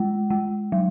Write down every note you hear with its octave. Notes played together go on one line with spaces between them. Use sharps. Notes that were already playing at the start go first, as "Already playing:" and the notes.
Already playing: G#3
G#3
F#3